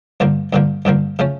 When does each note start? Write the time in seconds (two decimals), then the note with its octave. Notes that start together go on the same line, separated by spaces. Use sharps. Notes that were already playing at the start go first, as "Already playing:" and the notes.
0.20 G2 D3 F3 A#3
0.53 G2 D3 F3 A#3
0.85 G2 D3 F3 A#3
1.19 C#3 F3 A3 C#4